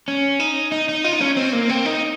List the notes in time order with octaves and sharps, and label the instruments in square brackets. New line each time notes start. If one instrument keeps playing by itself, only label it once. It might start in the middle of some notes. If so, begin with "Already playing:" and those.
[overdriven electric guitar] C#4
D#4
D#4
D#4
F4
D#4
C#4
C4
A#3
C4
D#4